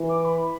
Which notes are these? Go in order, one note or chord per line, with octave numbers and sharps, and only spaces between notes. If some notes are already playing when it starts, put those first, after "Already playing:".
Already playing: E3
D6
B5